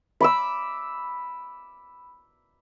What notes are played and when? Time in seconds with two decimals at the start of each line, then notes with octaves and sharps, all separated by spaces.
0.21 B5 D6 E6